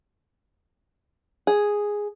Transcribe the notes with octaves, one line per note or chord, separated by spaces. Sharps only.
G#4